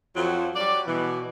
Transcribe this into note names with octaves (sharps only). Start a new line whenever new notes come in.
F2 F3 F#3 F#4
F#3 G3 D5
B2 E3